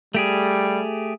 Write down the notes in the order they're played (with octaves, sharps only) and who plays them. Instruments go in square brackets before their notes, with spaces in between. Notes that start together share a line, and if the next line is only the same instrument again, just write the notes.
[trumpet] G3 [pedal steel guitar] A3 G4 G#4